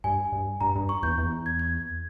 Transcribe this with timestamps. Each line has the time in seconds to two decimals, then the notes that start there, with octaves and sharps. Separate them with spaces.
0.04 G2 G#5
0.32 G2
0.61 G2 A#5
0.75 G2
0.89 C#6
1.03 E2 G6
1.18 E2
1.46 G#6
1.59 G#6